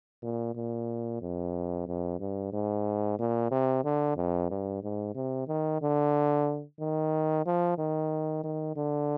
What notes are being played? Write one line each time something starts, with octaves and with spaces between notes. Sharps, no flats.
A#2
A#2
F2
F2
G2
G#2
A#2
C3
D3
F2
G2
G#2
C3
D#3
D3
D#3
F3
D#3
D#3
D3